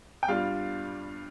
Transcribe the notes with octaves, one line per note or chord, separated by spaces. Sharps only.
G5
G2 G3 D4 F4 F5